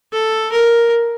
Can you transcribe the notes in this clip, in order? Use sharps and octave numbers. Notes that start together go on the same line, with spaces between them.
A4
A#4